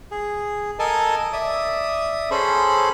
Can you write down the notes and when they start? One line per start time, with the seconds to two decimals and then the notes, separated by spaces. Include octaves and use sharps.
0.11 G#4
0.79 A4 A#4 D#5 G#5 A5
1.33 D5 E5 D#6
2.31 C#4 G#4 A4 C5 B5